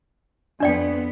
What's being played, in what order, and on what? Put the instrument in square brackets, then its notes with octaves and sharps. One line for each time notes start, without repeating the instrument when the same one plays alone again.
[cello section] F2 B3 [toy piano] D4 D5 G5